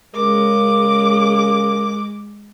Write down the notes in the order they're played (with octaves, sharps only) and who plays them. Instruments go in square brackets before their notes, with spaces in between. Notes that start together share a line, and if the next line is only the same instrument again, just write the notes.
[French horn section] C#3 A#4 [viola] G#3 D6